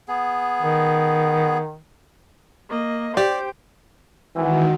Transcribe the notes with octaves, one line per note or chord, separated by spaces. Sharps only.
B3 G#4
D#3
A#3 D#5
G4 C5 D5 G5
D#3 E3 F#3 G#3 C4